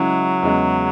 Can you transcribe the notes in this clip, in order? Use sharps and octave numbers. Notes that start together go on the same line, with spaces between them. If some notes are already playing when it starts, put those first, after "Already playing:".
Already playing: C#3 F#3 G#3 C#4 E4
E2 C#3 G#3